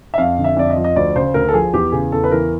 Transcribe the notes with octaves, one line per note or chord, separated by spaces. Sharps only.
E5
F2 F5
D3
E5
F2 D5
D#5
F3
D#5
D2 D5
C#3 C5
D2 A#4
A4
F3 G#4
E2 G4
C#3 G#4
E2 A4
B4
E3 A#4